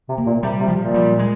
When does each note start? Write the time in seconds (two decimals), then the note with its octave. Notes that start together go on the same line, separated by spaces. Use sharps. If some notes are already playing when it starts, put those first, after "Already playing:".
0.09 C3
0.18 A#3
0.26 A#2
0.43 C3 G3
0.60 C3
0.68 F3
0.77 A#2
0.94 G3
1.19 G#3